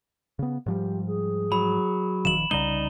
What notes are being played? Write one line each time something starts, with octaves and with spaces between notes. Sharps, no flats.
C#3 B3
G#2 F3 G3 G4
G#4
F#3 B5
D#1 D#3 F3 E7 F#7
C2 C#3 G3 D#4 D5 A#5 G7